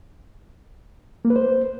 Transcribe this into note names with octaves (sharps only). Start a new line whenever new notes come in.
A#3
B4
C5